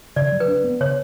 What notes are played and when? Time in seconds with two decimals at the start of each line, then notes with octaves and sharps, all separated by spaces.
0.16 C#3 D5
0.32 F#3
0.40 B4
0.48 D4
0.64 B3
0.80 C#3 C#5